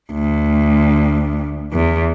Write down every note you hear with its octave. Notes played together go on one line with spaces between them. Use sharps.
D2
E2